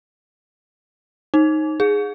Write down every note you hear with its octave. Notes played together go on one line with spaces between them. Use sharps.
D#4
G#4